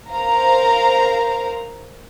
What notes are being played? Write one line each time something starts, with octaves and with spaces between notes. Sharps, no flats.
A#4 C5 F5 A#5